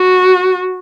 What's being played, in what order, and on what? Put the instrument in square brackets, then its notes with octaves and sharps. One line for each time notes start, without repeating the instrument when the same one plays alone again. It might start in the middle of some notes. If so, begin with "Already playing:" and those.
Already playing: [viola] F#4